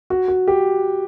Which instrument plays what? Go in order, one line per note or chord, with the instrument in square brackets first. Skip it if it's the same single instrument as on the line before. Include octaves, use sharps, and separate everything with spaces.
[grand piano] F#4
F#4
G4